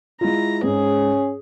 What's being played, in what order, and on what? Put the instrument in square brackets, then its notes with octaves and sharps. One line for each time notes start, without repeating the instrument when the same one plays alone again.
[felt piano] G#3 E4 F4 [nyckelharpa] A#5
[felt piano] G#2 [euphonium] C#4 [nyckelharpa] G#4